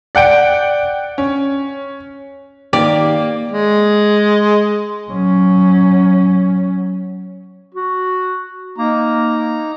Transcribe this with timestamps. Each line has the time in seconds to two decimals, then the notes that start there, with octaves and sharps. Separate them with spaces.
0.15 D5 F#5 G5 D7
1.18 C#4
2.73 D#3 A#3 G4 D5
3.52 G#3
5.10 F#3 C#4
7.74 F#4
8.78 A#3 D#4 A#5